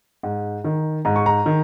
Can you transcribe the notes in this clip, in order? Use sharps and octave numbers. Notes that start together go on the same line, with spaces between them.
G#2
D#3
G#2 A#5
C#6
A#5
D#3